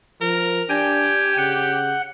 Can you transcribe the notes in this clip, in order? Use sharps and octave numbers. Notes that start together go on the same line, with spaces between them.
F3 A#4
D4 G4 G5 G#5
C#3 F#5 G6